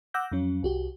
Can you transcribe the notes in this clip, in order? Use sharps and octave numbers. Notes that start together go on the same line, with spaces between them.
F#5 D6 E6 F#6 G6 A#6
F2 F#3 C#4
C2 F#4 G4